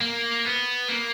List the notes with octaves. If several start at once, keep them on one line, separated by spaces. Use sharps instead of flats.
A#3
B3
A#3